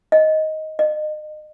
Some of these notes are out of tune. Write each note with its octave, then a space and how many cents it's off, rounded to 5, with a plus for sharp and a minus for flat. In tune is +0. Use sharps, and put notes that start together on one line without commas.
D#5 +10
D#5 -35